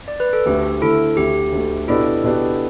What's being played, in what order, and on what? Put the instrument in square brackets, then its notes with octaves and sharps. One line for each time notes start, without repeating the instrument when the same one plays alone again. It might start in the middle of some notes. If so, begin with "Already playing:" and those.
[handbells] D5
B4
A4
[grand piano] D2 D3 A3 [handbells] G4
[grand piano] D2 D3 A3 [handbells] E4 A4
[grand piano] D2 D3 A3 [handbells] G4
[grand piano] D2 D3 A3
[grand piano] B2 B3 D4 G4 [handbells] E4 A4
[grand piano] B2 B3 D4 G4